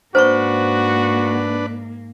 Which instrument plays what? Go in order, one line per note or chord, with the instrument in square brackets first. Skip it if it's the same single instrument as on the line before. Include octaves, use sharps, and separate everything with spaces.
[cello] G#2 A#3 [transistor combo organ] D4 B4 [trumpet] F#4 [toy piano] C5 A#5 C#6